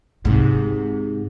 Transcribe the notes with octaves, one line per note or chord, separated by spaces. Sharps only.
G#2 C3